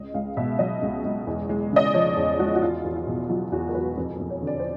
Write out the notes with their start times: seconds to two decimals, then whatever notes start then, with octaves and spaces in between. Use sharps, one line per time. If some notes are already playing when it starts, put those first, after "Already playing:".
Already playing: C#2 D#5
0.14 C#2 F5
0.37 B2 E5
0.59 F#3 D#5
0.82 C#2
1.05 C#2
1.27 E2
1.49 G#3
1.72 C#3 D#5
1.85 D5
1.94 F3 C#5
2.16 E2
2.39 G#3 F#4
2.56 F#4
2.62 E2 F4
2.84 E2
2.96 F4
3.07 B2
3.29 F#3 F4
3.52 E2 F#4
3.68 A#4
3.74 E2 B4
3.97 F2
4.19 F2
4.30 C#5
4.42 D3
4.47 D5
4.59 C5